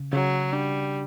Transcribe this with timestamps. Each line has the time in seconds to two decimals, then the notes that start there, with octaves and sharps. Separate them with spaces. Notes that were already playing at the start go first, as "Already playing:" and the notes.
Already playing: C#3
0.12 C#3 F#3
0.53 G3 D4